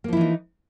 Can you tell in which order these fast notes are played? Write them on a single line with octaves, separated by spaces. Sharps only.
A#3 F3 E4 E3 D#4